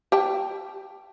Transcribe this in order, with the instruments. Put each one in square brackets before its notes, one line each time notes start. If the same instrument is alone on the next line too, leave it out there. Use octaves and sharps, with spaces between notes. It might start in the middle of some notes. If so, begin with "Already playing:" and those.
[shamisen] G4 G5 A5